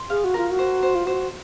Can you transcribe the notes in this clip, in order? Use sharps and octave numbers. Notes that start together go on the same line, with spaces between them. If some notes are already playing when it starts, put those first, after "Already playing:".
Already playing: C6
G#4 F5
F#4
F4 A#4
F#4
C5
C5
F4
F#4 C5